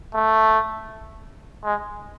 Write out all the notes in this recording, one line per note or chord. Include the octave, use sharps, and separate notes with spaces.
A3
G#3